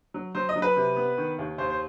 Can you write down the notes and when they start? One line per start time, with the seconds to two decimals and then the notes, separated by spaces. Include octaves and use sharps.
0.14 F#3
0.35 F#3 C5
0.49 D#5
0.56 F#3
0.62 B4
0.76 C3
0.96 B3
1.18 D#3
1.39 D#2
1.58 D#2 C5
1.70 C5